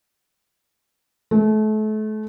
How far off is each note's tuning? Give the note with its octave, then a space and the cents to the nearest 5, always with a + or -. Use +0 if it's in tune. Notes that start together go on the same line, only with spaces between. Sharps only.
A3 -35